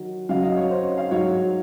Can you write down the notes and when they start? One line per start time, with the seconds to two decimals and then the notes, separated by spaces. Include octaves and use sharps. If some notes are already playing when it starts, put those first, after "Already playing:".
Already playing: D#3 F#3
0.29 F#2 C#3 F#3 F5
0.43 D#5
0.57 C#5
0.71 C5
0.84 C#5
0.97 F5
1.11 G#2 F#3 C#5